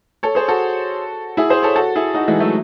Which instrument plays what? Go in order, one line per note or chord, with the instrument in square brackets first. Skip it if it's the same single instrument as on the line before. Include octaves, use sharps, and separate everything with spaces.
[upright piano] A4 C#5
G#4 C5
F#4 A4
E4 G#4
G#4 C5
A4 C#5
F#4 A4
E4 G#4
D#4 F#4
E3 G#3
F#3 A3